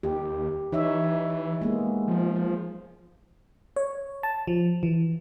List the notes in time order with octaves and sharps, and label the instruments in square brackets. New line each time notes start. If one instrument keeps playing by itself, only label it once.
[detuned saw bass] D#2 [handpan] G4
[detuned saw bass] E3 [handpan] D#4 C#5 E5
[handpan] G#3 A#3 B3
[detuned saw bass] F3
[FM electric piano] C#5
A5
F3
E3